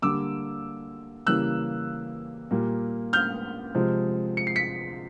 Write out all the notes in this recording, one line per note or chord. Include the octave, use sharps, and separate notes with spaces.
D3 G3 A#3 D6 E6
C#3 E3 G3 A#3 E6 F#6
A#2 G3 A#3
F6 G6
C3 F3 G#3
C#7
C7
B6 C#7